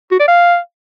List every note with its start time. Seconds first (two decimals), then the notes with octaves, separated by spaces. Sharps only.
0.11 F#4
0.20 D5
0.28 F5